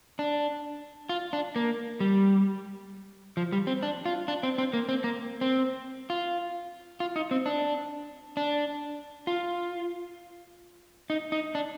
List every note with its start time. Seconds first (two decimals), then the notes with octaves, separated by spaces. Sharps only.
0.19 D4
1.09 F4
1.33 D4
1.56 A#3
2.00 G3
3.37 F3
3.52 G3
3.67 C4
3.83 D4
4.06 F4
4.28 D4
4.43 C4
4.58 C4
4.73 A#3
4.89 C4
5.04 A#3
5.41 C4
6.10 F4
7.00 F4
7.16 D#4
7.31 C4
7.46 D4
8.37 D4
9.27 F4
11.10 D#4
11.32 D#4
11.55 D4